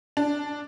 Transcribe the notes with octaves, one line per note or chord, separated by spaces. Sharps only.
D4